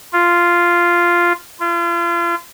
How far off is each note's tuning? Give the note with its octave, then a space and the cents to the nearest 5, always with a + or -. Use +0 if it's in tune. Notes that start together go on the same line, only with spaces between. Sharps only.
F4 -5
F4 -35